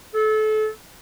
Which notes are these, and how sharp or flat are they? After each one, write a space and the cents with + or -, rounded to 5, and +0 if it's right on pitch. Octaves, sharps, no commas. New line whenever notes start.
A4 -30